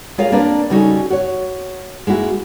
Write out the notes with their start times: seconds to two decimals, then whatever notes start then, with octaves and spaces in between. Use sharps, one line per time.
0.18 G#3 F4 G#4 A#4 C#5 F5
0.32 A#3 C4 D4 A#4 B4 D5
0.70 C#3 G3 C#4 D#4 F#4 A4
1.10 F#4 C#5
2.07 G#3 A#3 E4 F#4